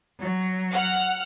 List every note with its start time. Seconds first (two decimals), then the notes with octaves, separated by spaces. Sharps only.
0.21 F#3
0.73 F#5 F6